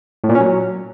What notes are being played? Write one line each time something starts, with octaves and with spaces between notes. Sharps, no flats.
A2
A#2
C#4
F#3